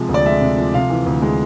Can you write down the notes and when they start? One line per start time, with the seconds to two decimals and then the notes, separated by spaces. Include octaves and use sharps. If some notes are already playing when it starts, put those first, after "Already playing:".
Already playing: C3 F3 G#3
0.09 D2
0.14 D5
0.25 G#3 E5
0.41 C3
0.58 F3
0.74 C3 F5
0.90 E3
1.06 D2
1.22 G#3